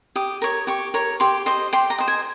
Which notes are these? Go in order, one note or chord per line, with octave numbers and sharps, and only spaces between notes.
G4 D#6
A#4 C#5
G4 C#6
A#4 C#5
G4 C6
C5 D#5
G4 C6
A#5
C5 D#5
G#5